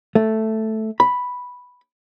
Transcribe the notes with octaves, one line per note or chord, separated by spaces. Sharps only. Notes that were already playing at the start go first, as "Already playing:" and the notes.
A3
B5